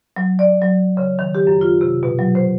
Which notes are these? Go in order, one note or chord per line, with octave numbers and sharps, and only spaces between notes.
F#3
D5
F#3
C#3
D#3
G4
F#2
F4
C3
B2
F#3
C5